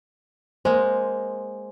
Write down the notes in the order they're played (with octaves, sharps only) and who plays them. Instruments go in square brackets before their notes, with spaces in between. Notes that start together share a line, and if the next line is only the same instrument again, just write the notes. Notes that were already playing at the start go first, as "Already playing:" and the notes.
[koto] G#3 A#3 [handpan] C5